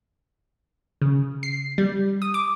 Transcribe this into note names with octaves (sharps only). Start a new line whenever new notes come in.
C#3
C7
G3
D#6
D6